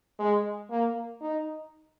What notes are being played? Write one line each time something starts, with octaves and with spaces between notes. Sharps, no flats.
G#3
A#3
D#4